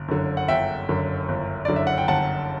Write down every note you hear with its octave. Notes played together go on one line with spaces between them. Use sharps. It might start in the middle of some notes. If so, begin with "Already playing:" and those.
Already playing: G1
F#2 D3
F#5
G1 E5 G5
F#2 D3
G1
F#2 D3 D5
E5
F#5
G5
G1 F#5 A5